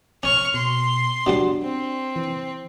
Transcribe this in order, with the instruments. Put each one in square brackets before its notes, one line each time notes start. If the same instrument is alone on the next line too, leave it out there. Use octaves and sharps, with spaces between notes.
[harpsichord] C#4 C#5 [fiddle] C#6 F6
[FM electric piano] B2 [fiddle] C6
[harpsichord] B2 F#3 G3 [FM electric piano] D4
[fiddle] C4
[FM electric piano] E3